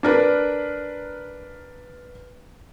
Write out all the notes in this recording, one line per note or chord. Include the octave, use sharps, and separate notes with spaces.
D4 A#4 B4